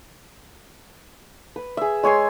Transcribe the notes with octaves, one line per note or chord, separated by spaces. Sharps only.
B4
G#4 E5
G#3 C#5 G#5 C6